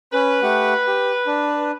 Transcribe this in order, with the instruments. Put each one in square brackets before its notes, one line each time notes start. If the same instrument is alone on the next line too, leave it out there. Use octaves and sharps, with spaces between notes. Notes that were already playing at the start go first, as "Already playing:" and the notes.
[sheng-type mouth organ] C#4 [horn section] B4
[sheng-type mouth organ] A3 G4 F#5
G4
D4